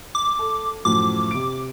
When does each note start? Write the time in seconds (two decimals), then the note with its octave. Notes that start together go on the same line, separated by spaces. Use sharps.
0.15 D6
0.39 A4
0.85 F#2 A2 F3 D6
1.31 C3 D7